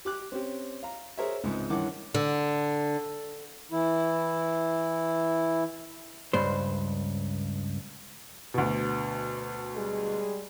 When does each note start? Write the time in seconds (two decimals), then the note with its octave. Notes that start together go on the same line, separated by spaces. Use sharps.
0.05 G4 D6 F#6
0.32 C4 C#4 G4
0.83 F5 A#5
1.18 G#4 A#4 C5 C#5 E5
1.44 C#2 G#2 C3
1.70 G2 D#3 E3 C#4 F#5 D6
2.14 D3
3.72 E3 E4
6.33 C#2 G2 C5
8.54 D2 B2
9.75 G3 G#3 G#4